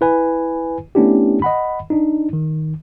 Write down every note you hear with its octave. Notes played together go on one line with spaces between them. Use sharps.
E4 B4 G#5
A3 B3 C#4 D4 E4 G4
D#5 F#5 B5
D4 D#4
D#3